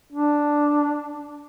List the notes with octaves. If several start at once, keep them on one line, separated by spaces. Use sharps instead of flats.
D4